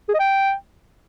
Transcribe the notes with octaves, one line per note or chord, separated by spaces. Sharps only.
G#4
D#5
G5